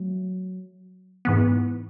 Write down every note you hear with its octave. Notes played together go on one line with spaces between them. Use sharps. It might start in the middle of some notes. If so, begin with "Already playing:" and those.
Already playing: F#3 A3
G#2 E3 B3